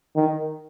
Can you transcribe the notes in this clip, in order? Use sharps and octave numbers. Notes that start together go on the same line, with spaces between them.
D#3